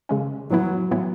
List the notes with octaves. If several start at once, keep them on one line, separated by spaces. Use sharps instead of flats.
C#3 G#3 C#4
A2 E3 F#3 B3 E4
A2 E3 B3 E4